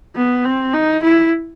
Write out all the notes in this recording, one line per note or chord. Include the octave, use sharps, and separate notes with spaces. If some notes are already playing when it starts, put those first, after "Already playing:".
B3
C4
D#4
E4